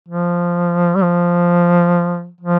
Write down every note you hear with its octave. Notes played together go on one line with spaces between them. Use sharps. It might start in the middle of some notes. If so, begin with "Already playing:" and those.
F3
G3
F3
F3